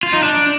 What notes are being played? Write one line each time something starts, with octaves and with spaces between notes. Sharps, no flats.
F4
D#4
D4